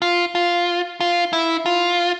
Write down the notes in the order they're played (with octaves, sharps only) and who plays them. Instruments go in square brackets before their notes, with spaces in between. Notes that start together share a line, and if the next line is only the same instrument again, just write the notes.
[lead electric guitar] F4
F4
F4
E4
F4